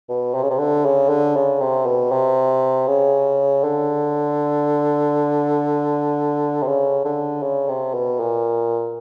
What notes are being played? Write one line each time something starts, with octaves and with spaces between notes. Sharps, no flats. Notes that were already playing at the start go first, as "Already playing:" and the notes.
B2
C3
C#3
C3
D3
C#3
D3
C#3
C3
B2
C3
C#3
D3
C3
C#3
D3
C#3
C3
B2
A#2